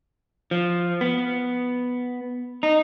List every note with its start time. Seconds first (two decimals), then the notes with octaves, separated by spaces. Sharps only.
0.51 F3
1.01 B3
2.63 D#4